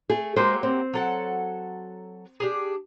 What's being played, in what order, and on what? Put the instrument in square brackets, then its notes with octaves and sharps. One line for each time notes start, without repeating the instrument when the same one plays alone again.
[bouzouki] A3 [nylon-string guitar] G#4
[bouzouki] F#3 A#3 G4 [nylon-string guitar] G#3 C5
[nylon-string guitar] C4
[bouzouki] F#3 A4 F#5
D4 G4 G#4